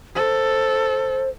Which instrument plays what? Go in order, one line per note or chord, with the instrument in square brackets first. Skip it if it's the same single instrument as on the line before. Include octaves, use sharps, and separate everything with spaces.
[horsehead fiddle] A4 [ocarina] C5